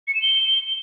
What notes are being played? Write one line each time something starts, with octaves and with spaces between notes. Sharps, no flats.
C#7
E7
G7